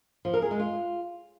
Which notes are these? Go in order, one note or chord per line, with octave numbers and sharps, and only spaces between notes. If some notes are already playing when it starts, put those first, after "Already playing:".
F3
A#4
G#4
G#3
F4